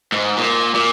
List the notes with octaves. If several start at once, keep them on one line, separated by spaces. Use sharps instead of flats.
G#2
A#2
A#2